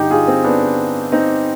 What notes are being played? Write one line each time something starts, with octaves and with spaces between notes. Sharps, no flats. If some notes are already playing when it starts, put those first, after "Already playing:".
Already playing: G2 D3 D#4 G4
F4 G#4
C4
B3 D4
C4 D#4